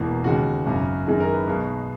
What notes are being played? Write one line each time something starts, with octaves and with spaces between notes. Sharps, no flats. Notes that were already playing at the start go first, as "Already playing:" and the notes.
Already playing: E1 E2 B2 A#3
D#2 C#3 G#3 F#4
G#1 F#2 C#3
F#2 D#3 G#3 G#4
A#4
B4
B1 B2 G#3